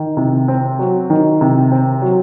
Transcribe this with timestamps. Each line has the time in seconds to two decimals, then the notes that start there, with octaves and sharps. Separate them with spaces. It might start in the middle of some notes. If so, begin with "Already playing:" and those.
Already playing: D#3
0.17 C3
0.48 C4
0.79 F#3
1.10 D#3
1.41 C3
1.72 C4
2.02 F#3